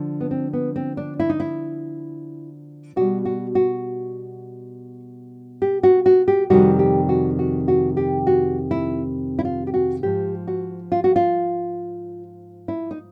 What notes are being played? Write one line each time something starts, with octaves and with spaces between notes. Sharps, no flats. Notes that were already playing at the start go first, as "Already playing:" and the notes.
Already playing: D3 F3
B3
C4
B3
C4
D4
E4
D#4
E4
B2 G3 F#4
F#4
F#4
G4
F#4
F#4
G4
F2 C3 D#3 G3 F#4
G4
F#4
F#4
F#4
G4
F#4
E4
E4
F4
G4
F#4
G#2 F3 G4
F#4
F4
F#4
F4
E4
D#4